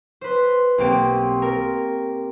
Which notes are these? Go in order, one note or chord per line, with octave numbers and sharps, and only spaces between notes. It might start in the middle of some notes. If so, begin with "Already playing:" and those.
B4 C5
B1 A#3 C4 G4 D7
A#4